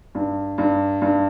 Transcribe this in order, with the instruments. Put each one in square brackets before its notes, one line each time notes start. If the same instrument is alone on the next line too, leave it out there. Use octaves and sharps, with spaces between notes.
[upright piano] G2
G2
G2